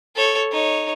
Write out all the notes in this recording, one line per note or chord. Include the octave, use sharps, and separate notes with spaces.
A4 C#5
D#4 C#5